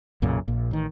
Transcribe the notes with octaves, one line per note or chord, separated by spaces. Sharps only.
B1 F#2 A#2 C#3
A#1 A#2
A1 D#3